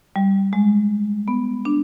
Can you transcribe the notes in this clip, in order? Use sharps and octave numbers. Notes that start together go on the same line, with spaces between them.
G3
G#3
B3
D4